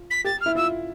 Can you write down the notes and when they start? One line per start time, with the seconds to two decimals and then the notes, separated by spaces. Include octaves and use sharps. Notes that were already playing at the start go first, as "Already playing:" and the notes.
Already playing: F4
0.10 B6
0.24 G4 A6
0.41 F6
0.46 E4
0.55 F4 E6